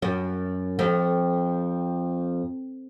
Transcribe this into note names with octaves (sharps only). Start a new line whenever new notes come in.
F#2
F2